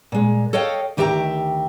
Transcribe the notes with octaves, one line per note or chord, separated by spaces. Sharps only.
A#2 G#3
A4 C#5 D#5 F5 G5
D2 D#3 G4 E5 G5 A#5